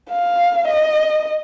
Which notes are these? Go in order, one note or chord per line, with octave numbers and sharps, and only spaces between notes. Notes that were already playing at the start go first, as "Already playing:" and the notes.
F5
D#5